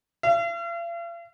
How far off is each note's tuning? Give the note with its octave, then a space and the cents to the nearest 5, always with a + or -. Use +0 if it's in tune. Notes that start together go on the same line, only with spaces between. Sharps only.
F5 -45